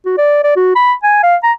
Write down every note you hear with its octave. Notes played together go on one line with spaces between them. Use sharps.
F#4
D5
D5
F#4
B5
G#5
F5
A#5